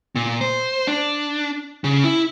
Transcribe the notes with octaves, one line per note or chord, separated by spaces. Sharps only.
A#2
C5
D4
C#3
E4